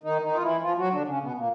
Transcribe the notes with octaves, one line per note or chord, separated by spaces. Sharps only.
D#3 D#4
D#3 D#4
F4
E3 E4
F3 F4
F#3 F#4
D3 D4
C#3 C#4
B2 B3
A#2 A#3